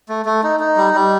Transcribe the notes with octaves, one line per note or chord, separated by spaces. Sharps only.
A3
A3
D#4
D#4
G3
G3